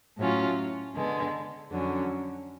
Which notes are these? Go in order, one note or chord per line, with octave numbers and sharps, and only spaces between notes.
A2 F#3 C#4 F4
D3 G#3 B3
F2 D3 F#3 C#4